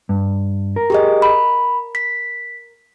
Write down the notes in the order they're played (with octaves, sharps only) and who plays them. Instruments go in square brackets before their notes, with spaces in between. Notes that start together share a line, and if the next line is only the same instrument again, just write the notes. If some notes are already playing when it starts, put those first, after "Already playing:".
[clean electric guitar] G2
A#4
[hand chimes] G4 G#4 D#5
B5
B6